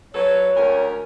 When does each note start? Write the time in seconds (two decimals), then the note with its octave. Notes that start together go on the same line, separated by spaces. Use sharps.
0.14 F#3 A4 B4 C#5
0.56 D2 C#4 A#4